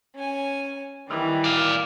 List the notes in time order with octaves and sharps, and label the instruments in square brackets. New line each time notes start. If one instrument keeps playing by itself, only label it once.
[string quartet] C#4 G#5
D#3 E3 G3
[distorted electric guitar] D5 F5